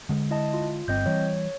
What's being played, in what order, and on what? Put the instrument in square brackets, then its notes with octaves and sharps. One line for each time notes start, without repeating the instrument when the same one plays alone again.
[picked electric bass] D3 G#3
[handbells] E4 D#5 A5
F4
[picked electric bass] G1 [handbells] C4 D#5 G6
[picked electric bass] E3 G3 [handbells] C#5